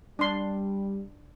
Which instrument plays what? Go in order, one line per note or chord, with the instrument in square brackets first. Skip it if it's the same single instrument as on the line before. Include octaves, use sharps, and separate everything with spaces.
[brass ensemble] G3 [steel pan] D4 C6